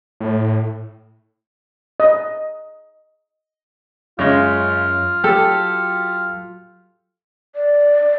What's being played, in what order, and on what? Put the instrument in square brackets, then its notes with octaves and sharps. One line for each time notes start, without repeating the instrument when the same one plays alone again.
[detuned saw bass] A2
[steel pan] D#5
[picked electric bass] F#2 [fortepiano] C#3 G#3 [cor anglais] F4
[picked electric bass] F#3 [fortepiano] G4 A4
[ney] D5